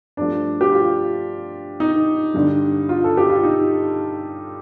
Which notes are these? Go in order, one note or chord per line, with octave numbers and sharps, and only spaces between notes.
G2 F3 A3 D4
G4
F4
D#4
G2 D3 G3
F4
A4
G4
F4
D#4